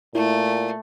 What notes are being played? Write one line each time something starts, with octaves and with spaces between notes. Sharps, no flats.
A#2 A3 E4